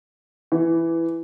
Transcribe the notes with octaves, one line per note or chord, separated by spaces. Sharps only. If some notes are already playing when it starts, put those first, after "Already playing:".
E3